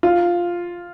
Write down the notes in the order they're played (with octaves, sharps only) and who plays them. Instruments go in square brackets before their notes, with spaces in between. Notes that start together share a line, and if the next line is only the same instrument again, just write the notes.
[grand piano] F4